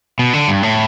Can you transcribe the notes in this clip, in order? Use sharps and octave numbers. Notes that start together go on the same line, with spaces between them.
B2
D3
G2
A2